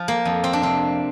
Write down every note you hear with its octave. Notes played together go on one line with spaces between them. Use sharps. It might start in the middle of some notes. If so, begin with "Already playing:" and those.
Already playing: F3
A#3
F2
C4
D4
C3 C4